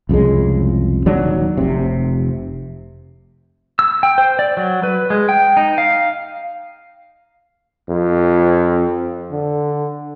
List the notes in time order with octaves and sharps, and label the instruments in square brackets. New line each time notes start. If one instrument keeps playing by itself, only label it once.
[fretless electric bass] C2 F2 C#3 G#3
D#1 D#3 F#3 D4
F1 C3
[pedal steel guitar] E6
G5
C5
D5
F#3
B4
G#3
G5
D#4
F5
[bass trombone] F2
D3